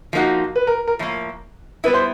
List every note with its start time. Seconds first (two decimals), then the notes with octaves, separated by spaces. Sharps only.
0.13 F3 A#3 D#4 F#4
0.56 B4
0.67 A#4
0.88 A#4
0.99 A2 F3 A#3
1.84 G3 B3 E4 B4
1.94 C5